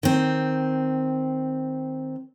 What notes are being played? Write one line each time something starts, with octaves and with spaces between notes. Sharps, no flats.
D#3 C4